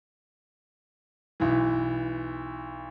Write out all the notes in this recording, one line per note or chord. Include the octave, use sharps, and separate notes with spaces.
B1 E3